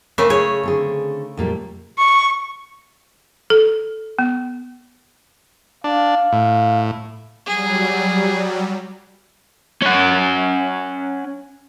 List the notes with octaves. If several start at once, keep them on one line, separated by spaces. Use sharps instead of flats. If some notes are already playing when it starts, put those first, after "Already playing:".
C#3 A3 C4 A#4 B4
G#4 C#5
D3 C4 G#4
F2 A#2 G3
C#6
A4
B3
D4 F5
A2
F#3 G3 G#4
C#4 F#5